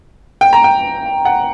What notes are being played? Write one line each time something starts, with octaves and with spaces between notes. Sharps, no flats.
G5
A#5
G5
F#5